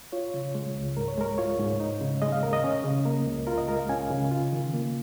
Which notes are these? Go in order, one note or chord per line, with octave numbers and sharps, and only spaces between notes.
F4 C#5
C#3
G#3
C#2
G#2 A#4
C#5
G#3 A#4
F4 C#5
G#2
D#4
C#3
G#3 D#5
F5
D#2 A#4
D#5
C#4
C#3
A#3 A#4
C#2
F4 A#4
D#5
G#3 A#4
F5
C#4 G#5
C#3
F4
D#3
A#3